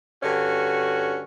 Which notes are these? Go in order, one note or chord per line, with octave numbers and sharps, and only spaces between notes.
G2 D3 C#4 F#4